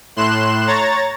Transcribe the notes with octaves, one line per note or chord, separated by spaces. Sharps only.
A2 C6 F#6 E7
C#5 A#5 A6